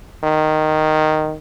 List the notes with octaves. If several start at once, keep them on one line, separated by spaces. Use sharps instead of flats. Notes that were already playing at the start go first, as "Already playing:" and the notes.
D#3